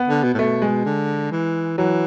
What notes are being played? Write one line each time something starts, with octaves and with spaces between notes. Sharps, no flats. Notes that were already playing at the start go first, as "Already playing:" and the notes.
Already playing: B3
D3
B2
A2
B2 A3
G#3
D3
E3
E3 F#3